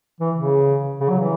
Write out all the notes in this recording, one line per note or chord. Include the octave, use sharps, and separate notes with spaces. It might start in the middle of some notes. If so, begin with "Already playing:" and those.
E3
C#3
C#3
F#3
E3